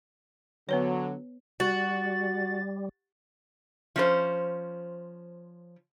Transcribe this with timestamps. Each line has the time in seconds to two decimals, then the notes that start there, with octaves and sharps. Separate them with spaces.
0.69 D3 F#3 B3 B4 C#5
1.60 G3 F#4 A6
3.96 F3 C#4 C5